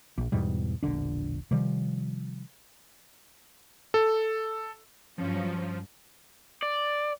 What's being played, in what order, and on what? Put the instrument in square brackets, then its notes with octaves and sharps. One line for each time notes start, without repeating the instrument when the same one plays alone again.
[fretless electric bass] A#1
E2 G#2 B2 G3
E1 A#1 D3 D4
C3 D#3 F3 G3
[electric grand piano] A4
[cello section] G2 F#3 C#4 [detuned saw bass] F3
[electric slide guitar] D5